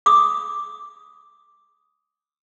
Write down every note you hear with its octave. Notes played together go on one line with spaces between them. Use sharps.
D6 D#6